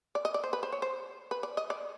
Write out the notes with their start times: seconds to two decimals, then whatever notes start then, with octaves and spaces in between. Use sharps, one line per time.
0.15 D5
0.25 D#5
0.34 D5
0.44 C5
0.53 B4
0.63 C5
0.72 C#5
0.82 C5
1.31 B4
1.43 D5
1.57 D#5
1.70 D5